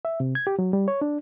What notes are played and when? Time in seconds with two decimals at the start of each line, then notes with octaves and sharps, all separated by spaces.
0.05 E5
0.20 C3
0.35 G#6
0.47 G4
0.59 F#3
0.73 G3
0.88 C#5
1.01 D4